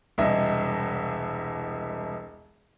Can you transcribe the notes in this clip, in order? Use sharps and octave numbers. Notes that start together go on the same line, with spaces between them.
E1 C2 D#5 E5